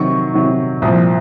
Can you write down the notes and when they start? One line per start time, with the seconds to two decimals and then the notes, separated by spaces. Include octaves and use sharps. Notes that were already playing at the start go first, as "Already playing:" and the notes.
Already playing: C3 D#3 F#3 C#6
0.34 C3 D#3 F#3
0.82 C2 A#2 F3 D#6